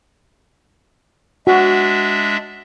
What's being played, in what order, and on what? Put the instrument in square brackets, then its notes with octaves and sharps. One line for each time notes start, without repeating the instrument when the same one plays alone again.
[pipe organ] G#3 D4 E5 [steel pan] F#4